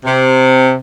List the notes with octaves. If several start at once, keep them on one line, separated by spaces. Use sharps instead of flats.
C3